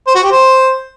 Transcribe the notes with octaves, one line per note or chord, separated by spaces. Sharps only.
C5
F#4
G4
C5